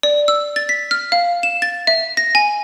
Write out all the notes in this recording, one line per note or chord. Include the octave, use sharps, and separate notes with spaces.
D5
E6
A6
B6
F6
F5
E7
A6
E5
A#6
G#5